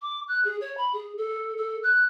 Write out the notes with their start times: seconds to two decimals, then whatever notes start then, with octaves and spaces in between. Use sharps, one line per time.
0.02 D6
0.28 F#6
0.45 G#4
0.61 C#5
0.77 B5
0.94 G#4
1.18 A4
1.57 A4
1.83 F#6